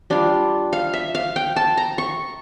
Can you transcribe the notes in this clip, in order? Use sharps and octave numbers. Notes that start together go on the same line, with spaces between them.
G3 D4 F4
F5
E5
F5
G5
A5
A#5
C#6